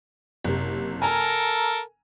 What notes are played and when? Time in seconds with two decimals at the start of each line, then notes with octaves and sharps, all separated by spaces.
0.44 F#1 C3
1.02 A4 A#4 G#5 A#5